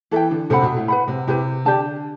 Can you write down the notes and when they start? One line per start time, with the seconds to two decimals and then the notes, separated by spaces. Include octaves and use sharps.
0.11 E3 A4 E5 G5
0.31 D3
0.50 C3 A4 C5 F#5 B5
0.63 B2
0.76 A2
0.88 B4 F#5 B5
1.08 C3
1.27 C3 E4 G4 B4
1.65 D3 G4 D5 A5